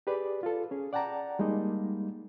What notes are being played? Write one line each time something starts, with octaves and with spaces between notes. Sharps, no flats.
G4 G#4 B4 D5
F4 A4
C#4 G#4
D5 F#5 G5 A5 A#5
G3 G#3 A#3 D#4